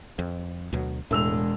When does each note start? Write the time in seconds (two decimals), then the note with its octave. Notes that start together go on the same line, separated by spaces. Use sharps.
0.19 F2
0.73 D2 B2 F#3
1.11 E1 A2 G#3 E6 F7